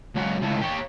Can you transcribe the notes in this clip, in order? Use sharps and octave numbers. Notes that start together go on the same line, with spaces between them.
C#2 F#3
C#2 A2
G4 C#5